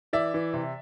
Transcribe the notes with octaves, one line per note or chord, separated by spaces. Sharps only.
E3 D5 E5
E3
C3